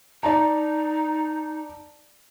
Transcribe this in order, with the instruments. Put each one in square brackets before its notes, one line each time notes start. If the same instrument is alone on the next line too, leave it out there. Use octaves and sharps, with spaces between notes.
[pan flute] D#4 [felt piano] D5 A5 A#5